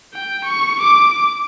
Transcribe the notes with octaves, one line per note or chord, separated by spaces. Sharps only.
G5
C#6
D6